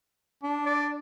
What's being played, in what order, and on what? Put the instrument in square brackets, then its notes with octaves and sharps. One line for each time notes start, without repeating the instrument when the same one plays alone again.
[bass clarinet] D4
[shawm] D5